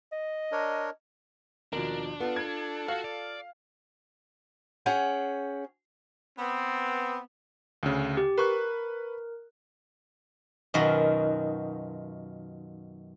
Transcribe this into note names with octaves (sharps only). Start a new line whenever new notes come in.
D#5
D4 A#4 C#5
D#2 B2 F3 D4 A#4
B3 F4 A4
G#6
F#4 F5
D5
C#4 G#4 F#5 G5
B3 C4
D2 C#3
G4
A#4 B4 C#6 F#6
F#2 B2 D#3 F4 F#4